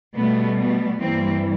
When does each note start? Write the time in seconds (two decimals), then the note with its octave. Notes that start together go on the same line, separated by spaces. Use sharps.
0.15 B2 G3 A3 B3
0.58 A3 B3
1.01 G2 E3 G3 A#3 C4